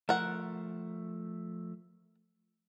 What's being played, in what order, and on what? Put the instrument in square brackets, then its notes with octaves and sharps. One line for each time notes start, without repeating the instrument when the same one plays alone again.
[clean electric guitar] F3 A3 [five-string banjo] A#4 F#5